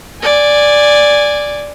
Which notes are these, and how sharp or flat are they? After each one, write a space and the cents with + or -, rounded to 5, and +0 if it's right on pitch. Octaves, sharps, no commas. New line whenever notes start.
D5 +0 G#5 -10